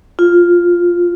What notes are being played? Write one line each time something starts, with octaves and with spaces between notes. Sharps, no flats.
F4